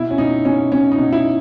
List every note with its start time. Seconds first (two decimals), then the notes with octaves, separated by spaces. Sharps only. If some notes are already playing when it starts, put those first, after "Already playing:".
Already playing: B2 E4
0.11 C#4
0.18 B2 D#4
0.45 B2 C#4
0.72 B2 C#4
0.92 D#4
0.98 B2
1.13 E4